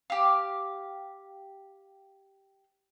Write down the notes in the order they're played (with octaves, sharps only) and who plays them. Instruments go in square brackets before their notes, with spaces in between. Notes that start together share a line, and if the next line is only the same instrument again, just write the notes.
[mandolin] G4 F5